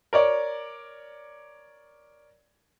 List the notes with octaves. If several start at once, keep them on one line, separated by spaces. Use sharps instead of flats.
A#4 C#5 D5